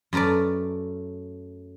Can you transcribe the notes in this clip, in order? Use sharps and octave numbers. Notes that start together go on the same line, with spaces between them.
F#2 A3 A#4 B4 D5